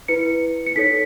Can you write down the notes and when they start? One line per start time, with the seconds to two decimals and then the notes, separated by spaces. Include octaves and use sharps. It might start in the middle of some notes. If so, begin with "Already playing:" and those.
0.08 E4 B4 C#7
0.66 C#7
0.75 D#4 A4 C#5 B6